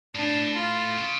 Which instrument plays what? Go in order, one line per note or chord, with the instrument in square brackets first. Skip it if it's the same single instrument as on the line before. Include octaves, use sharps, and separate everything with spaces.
[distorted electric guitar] A2 [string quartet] D4
[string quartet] F4
[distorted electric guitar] C#3